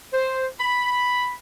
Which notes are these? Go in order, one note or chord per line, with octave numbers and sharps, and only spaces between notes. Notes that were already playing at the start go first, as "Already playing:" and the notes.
C5
B5